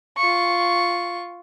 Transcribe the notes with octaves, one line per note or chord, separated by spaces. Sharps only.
F4 C#6